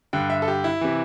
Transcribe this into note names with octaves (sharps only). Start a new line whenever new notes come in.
G2 D3 G5
E5
A4
G4
E4
C3 E3